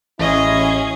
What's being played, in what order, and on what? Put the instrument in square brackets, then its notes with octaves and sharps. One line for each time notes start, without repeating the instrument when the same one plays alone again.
[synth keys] A1 [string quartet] C#4 G#4 [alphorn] E4 [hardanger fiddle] D#5